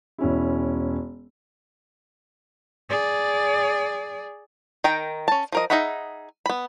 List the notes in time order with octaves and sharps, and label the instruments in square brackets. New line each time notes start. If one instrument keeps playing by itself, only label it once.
[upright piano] E1 C#4 E4
[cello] G#4 D5
[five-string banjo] D#3 A#4 G5
C#4 A5
F3 A#4 D#5
D#4 G#4 E5 F#5 B5
B3 B5